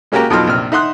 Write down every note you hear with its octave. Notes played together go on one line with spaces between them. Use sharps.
G#3 A#3 C#4 F#4 G4 A#4
F2 B2 F#3 D#4 C6 F6
A#1 C3 F6
D#4 E5 F#5 C6 D#6 F#6